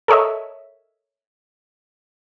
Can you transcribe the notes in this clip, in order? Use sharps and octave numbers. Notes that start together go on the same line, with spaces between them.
A4 A#4 C#5 D#5 E5